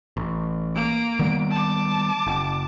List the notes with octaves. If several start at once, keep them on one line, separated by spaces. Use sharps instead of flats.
A1
A#3 D7
D#3 G3 B3
A5 D6
F#1